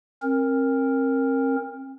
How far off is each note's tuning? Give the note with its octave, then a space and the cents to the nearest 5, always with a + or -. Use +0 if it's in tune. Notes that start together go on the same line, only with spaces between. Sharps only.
C4 +40 A#4 +0